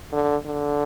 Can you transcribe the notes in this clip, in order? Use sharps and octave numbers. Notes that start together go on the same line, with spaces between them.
D3
D3